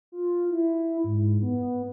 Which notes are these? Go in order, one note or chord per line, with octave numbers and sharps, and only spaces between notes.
F4
E4
G#2
B3